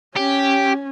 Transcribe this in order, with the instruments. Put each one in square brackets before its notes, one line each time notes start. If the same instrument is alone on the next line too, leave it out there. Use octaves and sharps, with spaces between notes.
[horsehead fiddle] C#4 [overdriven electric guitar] G4